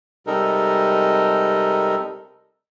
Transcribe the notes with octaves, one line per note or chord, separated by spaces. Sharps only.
C3 G3 G#3 D#4 A4 A#4